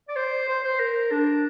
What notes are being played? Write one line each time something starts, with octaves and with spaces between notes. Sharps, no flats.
D5
C5
C5
C5
A#4
D4